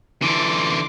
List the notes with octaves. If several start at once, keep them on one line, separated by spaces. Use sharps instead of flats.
D3 E3 C6 D6